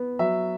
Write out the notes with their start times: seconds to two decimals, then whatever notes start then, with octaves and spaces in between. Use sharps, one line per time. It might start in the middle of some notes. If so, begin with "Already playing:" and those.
Already playing: B3
0.19 F#3 E5